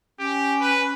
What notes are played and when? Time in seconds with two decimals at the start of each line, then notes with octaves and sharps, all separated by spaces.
0.19 C#4 G4
0.61 B4